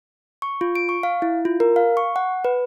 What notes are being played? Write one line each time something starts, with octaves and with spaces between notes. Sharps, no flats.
C#6
F4
D7
C#6
F5
E4
F4
A#4
F5
C#6
F#5
B4